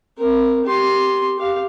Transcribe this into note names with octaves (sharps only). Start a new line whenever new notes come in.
C4 A#4
G4 C6
G4 F5